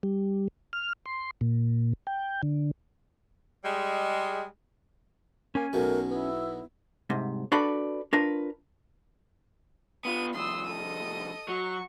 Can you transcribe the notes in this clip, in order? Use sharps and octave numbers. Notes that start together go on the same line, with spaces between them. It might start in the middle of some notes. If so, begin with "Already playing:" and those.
G3
F6
C6
A#2
G5
D3
G3 G#3
A#3 C#4 G#5
B1 B2 F#3 A3 A#4
B3 E4
C2 G#2 C3
D4 F#4 A4 B4 D5 B5
D4 F4 A#4 B4
B3 F4 D#7
C2 F2 C6 D#6 E6
A4 D#5 D#6
F#3 F#4 C#6